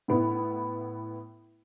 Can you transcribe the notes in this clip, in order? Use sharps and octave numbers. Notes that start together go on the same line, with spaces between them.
A2 B3 E4